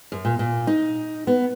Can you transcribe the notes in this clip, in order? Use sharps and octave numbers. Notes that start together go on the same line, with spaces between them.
F#2
A#2
A#2
D#4
B3